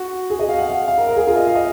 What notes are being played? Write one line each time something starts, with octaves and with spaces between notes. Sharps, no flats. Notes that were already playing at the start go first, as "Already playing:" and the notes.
Already playing: F#4
G#4
D#5
F5
F#5
F5
F5
A#4
A#4
G#4
F4
D#5
F5
D#5